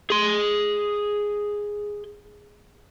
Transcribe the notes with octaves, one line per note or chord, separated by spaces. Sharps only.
G#4 C6